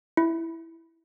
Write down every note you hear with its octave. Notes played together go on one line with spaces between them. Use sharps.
E4